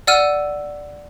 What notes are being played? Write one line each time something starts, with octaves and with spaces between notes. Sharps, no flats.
D5 F#5 E6 F6 D#7